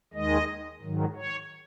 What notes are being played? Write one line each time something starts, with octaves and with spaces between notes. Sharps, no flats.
D#2 D#3 G#3 D#5
G#2 D#3 F#3
C#5